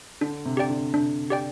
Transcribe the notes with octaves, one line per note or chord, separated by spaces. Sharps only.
D3 D4
C3
G4 D5 G5
D3
C3 D4
G4 D5 G5